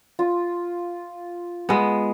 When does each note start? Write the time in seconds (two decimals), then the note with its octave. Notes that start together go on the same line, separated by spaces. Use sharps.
0.19 F4
1.69 G#3 B3